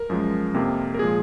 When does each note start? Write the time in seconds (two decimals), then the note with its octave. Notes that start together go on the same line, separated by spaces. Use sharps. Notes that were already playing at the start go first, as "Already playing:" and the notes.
Already playing: A#4
0.10 F#2 F3 G#3
0.54 F2 C3 F3 A#3
0.94 A#4
0.99 A#2 F3 G#3 G#4